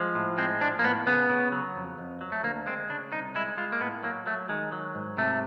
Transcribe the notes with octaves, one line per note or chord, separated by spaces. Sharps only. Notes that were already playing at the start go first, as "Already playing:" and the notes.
Already playing: F3 G#3
A2
G#3 C4
F3 D4
A#3
A2 B3
C#3 B3
C#3
F#3
F2
F2
F#3
A3
D2 A#3
G#3 C4
C#3 D4
C2 D#4
G#3 E4
G#3 F4
A#3
A2 B3
F#3 A#3
F#3 A3
D#3 G#3
F#3
G#2
C3 A3